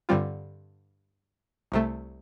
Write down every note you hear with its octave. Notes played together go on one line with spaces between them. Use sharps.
G2 D3 G3 C4 F4
C2 C3 A3